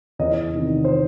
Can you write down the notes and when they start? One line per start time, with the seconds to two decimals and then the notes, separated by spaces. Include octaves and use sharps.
0.19 E2 D#5
0.53 C3 D#3
0.85 C5